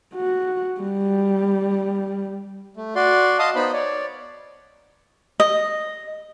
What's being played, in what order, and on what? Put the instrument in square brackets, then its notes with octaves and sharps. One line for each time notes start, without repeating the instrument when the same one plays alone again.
[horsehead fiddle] F#4
G3
[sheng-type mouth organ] A3
F#4 D5 C6
D#5 F5 A5 C6 D#6
B3 D#4 C5 B5
C#5 D5
[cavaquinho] D#5